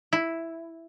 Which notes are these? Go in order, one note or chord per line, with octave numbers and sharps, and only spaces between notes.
E4